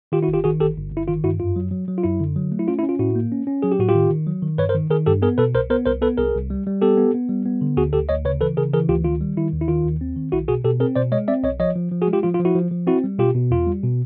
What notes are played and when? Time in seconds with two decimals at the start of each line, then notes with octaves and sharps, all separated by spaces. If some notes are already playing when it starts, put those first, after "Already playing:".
0.12 D#3 F4 G4
0.23 E4 F#4
0.28 G1
0.34 F4 G4
0.44 D#3 F#4 G#4
0.60 G1 G4 A4
0.77 G1
0.93 G1 E4
1.08 D#3 F4
1.24 G2 E4 F#4
1.40 F#2 F4
1.56 F#3
1.71 F#3
1.88 F#3
1.98 F4
2.04 F#2 E4
2.20 D3
2.36 F#3
2.52 A3
2.59 E4
2.68 C#4 F4
2.79 E4
2.83 C#4
2.89 F4
2.99 A2 E4 F#4
3.15 A#3
3.32 C#4
3.47 C#4
3.62 F#3 G#4
3.72 G4
3.79 A2 F#4
3.89 F4 G4
3.95 D#3
4.10 D#3
4.27 F#3
4.43 D#3
4.58 G2 B4 C#5
4.69 A#4 C5
4.75 D#3
4.90 D#3 G#4 A#4
5.06 G2 G4 A4
5.22 B3 G#4 A#4
5.38 B2 A4 B4
5.54 C2 A#4 C5
5.70 B3 A#4 C5
5.86 C2 A#4 C5
6.02 B3 A4 B4
6.17 C2 G#4 A#4
6.34 C2
6.50 G3
6.66 G3
6.82 B3 G4 A4
6.97 B3
7.14 B3
7.29 G3
7.45 B3
7.61 D3
7.77 D2 F#4 G#4
7.93 D2 G4 A4
8.09 D2 C#5 D#5
8.25 C#3 B4 C#5
8.41 E3 A4 B4
8.57 C#3 G#4 A#4
8.73 E3 G#4 A#4
8.89 D2 F4 G4
9.04 D#3 F4
9.21 G3
9.37 D#3 E4
9.53 D#2
9.61 E4
9.68 D#3 F4
9.85 D#2
10.01 C4
10.16 D#3
10.32 B1 E4 F#4
10.48 B2 F#4 G#4
10.64 B2 G4 A4
10.80 C4 G#4 A#4
10.96 B2 C5 D5
11.12 G#3 C#5 D#5
11.28 C4 D5 E5
11.43 B1 C#5 D#5
11.60 F3 C#5 D#5
11.76 F3
11.92 F3
12.02 F#4 G#4
12.08 G#3
12.13 F4 G4
12.23 F3 F4
12.34 F4
12.39 F3
12.45 E4 F#4
12.55 F3
12.71 F3
12.87 C4 E4 F#4
13.04 G3
13.19 B2 F4 G4
13.35 B2
13.51 E2 F4
13.66 G3
13.83 B2